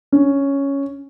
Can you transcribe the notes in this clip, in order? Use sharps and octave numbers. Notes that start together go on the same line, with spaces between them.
C#4